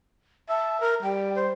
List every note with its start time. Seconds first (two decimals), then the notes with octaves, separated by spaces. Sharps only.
0.49 E5 A5
0.81 A#4
1.03 G3 G5
1.35 C5